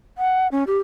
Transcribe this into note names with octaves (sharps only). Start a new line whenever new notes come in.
F#5
C#4
G4